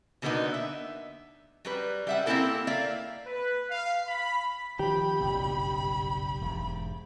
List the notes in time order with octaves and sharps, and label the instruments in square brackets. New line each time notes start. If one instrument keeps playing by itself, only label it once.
[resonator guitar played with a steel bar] B2 D3 G3 A#3 B3 D#4
E5
F#3 G3 B4
G3 E5 F#5
A#3 C4 C#4 E4 A4 A#4
A#3 D5 E5 F5
[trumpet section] B4
F5
B5
[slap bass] D#3 F3 [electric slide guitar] G4 [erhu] B5
[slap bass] F#1 B1 G2
E1 G#2